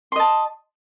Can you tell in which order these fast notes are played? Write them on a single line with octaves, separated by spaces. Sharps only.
C6 D#5 A5